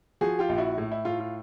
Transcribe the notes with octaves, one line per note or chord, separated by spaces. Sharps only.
F3 F#4 G#4
F4 G4
A#1
E4 F#4
A2
E4
A2 F4
F4